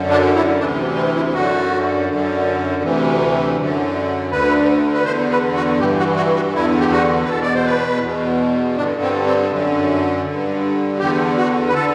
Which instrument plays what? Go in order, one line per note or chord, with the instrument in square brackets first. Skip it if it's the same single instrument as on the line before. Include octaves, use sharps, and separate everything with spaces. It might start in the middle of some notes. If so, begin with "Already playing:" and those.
Already playing: [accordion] F#2 D3
D4
E4
D2 C3 E3 D4
C4
E4
F#2 D3 F#4
F#2 D3
D2 C3 E3
F#2 D3
D2 D3 B4
B4
E2 D3 C5
B4
F#4
G2 E3 G4
F#4
F#4
F#4
E2 D3 E4
G4
F#4
B4
E2 B2 A4
D5
C5
B4
E2 B2
G2 D3 D4
C4
C4
F#2 D3
G2 D3
E2 D3 G4
F#4
B4
D3 A4